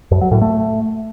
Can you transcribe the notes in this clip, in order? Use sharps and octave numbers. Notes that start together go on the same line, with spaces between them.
F#2
F#3
A2
A3